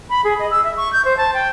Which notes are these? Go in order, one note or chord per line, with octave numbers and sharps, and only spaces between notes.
B5
G#4
D#5
E6
E5
C#6
G6
C5
A5
G5